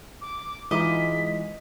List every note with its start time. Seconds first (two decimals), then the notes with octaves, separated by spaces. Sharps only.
0.21 D6
0.71 E3 G#3 D#4 F4 D#5 D6 B6